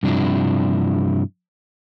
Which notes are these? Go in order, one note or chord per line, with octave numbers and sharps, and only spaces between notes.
G2 C3 F3 D4 E4